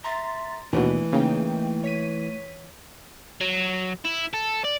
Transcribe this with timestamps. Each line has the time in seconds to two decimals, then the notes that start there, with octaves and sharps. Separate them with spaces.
0.04 E5 A#5 C6 A6
0.73 D#2 B2 E3 A3 D4
1.13 C#3 A#3 D#4 G5
1.84 C#5 B6 D#7
3.41 F#3
4.05 E4
4.34 A4
4.65 D5